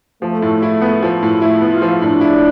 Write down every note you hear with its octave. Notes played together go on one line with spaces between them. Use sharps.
F3 A3
A2
E4
B3
F3
A2
A3 E4
B3
F4
F3
A2 D4
E4